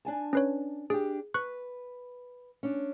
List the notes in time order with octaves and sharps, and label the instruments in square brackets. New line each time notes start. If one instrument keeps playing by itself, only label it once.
[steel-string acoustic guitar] D4 G#5 A5
[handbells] C#4 B4 C#5
[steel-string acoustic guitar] D4 G4 [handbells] G#4
[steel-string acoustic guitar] B4 [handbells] C#6 F#6
[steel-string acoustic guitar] C#4 D4